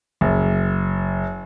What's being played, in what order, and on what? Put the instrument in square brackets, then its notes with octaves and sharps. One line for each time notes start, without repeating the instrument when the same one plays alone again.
[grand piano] F#1